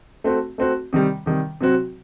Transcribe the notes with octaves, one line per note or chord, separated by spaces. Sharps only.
A3 C4 F#4
A3 C4 F#4
C3 D#3 G3
C3 D#3 G3
C3 F#3 C4 F#4